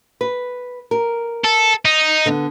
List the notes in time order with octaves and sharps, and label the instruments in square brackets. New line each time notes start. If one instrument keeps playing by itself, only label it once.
[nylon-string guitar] B4
A#4
[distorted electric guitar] A4
D#4
[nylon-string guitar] D3 B3